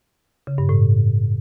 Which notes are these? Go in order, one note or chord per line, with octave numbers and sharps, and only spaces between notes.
C#3
G2
A2